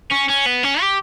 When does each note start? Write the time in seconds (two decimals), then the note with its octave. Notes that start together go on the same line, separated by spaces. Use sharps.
0.11 C#4
0.29 C#4
0.46 B3
0.63 C#4
0.81 G4